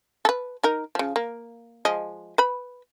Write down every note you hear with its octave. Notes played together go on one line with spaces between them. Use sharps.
A4 B4
D#4 A#4
C#3 F3
A#3
F3 G#3 D#5
B4 B5